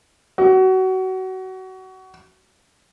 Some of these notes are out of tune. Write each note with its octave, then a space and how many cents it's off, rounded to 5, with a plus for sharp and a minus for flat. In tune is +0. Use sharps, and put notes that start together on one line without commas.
F#4 +25